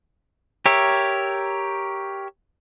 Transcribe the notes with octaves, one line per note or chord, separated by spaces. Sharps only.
G4 A#4 C#5 E5